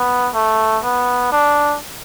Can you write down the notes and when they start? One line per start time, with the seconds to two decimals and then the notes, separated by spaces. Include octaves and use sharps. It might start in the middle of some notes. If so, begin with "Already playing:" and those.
Already playing: B3
0.35 A3
0.84 B3
1.32 D4